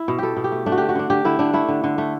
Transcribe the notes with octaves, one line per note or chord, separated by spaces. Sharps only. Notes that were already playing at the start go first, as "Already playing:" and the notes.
Already playing: E4
B2
B2 G4 A4
B2
G4
A3
A3 D4
F#4
D3 G4
F#4
D3 D4
D3 G4
D3 E4
D3 D4
A3 E4
D3
D3
A3